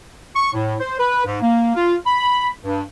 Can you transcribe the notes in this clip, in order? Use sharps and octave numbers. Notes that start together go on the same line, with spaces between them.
C#6
A2
C5
B4
G#2
A#3
F4
B5
G2